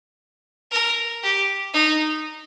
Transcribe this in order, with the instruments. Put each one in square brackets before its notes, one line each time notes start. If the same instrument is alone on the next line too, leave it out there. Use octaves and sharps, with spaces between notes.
[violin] A#4
G4
D#4